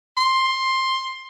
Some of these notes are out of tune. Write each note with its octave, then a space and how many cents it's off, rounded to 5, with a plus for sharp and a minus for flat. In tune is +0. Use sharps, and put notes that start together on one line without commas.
C6 +10